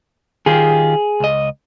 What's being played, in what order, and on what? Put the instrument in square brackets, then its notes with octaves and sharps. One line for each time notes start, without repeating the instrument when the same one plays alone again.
[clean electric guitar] D#3 F4 G4 [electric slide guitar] G#4
[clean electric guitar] C#2 D#5